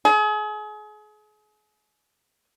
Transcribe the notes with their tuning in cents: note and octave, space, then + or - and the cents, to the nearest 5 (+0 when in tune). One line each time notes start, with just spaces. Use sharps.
G#4 +35